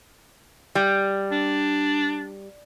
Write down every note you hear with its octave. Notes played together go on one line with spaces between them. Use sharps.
G3
D4